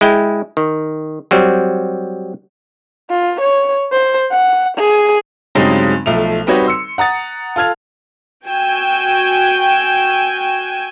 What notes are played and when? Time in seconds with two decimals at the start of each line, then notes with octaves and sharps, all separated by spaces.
0.01 G#3 E4 G5
0.57 D#3
1.31 F#3 G3 C4
3.10 F4
3.41 C#5
3.92 C5
4.31 F#5
4.78 G#4
5.55 G2 C#3 F#3 G#3 C4 D#4
6.06 B1 F3 A3 F7
6.47 G3 C4 D#4 F#4 B4 C#5
6.66 C6 E6 C#7
6.98 F#5 A#5 D#6 A6
7.56 F4 A4 F6 G#6 F7
8.46 F#4 G5 G#5 E6